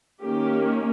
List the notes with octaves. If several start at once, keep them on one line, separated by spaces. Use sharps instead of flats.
D#3 A#3 C#4 G4